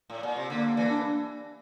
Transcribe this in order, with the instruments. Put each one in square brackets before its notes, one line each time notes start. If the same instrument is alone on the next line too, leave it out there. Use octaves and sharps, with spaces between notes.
[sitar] A2
A#2
C3
[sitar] D3 [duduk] A#3
[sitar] E3
[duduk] D4